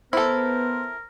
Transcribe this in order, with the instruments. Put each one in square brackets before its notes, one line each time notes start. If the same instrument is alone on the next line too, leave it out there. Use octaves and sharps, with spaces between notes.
[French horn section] B3 [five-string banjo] E4 A4 [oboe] A#4 [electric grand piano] C5